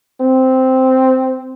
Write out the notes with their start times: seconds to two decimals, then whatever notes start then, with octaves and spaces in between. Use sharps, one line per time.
0.21 C4